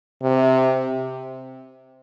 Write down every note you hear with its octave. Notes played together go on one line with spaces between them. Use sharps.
C3